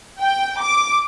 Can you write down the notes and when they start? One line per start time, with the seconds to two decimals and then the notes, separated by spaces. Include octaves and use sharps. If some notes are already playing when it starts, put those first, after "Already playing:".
0.20 G5
0.62 D6